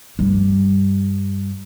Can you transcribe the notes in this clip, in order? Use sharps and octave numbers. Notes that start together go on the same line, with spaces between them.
G2 G3